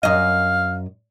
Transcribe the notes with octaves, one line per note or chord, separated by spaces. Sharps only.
F#2 D#5 F5